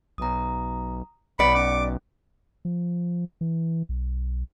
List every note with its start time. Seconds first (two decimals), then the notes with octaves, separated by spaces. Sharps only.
0.18 B1 A#5 D#6
1.39 B1 B4 D5 F#5 B5 C#7
1.55 C#4 D6
2.65 F3
3.41 E3
3.89 B1